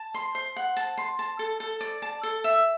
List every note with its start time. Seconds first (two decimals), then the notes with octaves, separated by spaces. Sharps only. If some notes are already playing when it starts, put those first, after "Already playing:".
Already playing: A5
0.14 C6
0.35 C5
0.56 F#5
0.77 A5
0.98 C6
1.19 A5
1.39 A4
1.60 A4
1.81 D5
2.02 A5
2.23 A4
2.44 E5